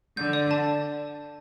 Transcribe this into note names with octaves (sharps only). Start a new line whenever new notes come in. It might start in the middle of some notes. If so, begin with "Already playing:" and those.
D3 G6
D5
A5